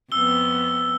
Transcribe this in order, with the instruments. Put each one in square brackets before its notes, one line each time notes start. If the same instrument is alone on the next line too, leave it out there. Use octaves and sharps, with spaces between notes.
[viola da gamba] F2 B3 [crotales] E6 G7